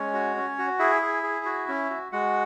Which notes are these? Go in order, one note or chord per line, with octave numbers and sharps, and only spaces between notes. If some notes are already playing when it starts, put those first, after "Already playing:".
Already playing: G#3 C#4 C#5
F#4
C#4
F#4
E4 G#4 E5
G#4
G#4
F#4
C#4
F#4
G#3 F#4 F#5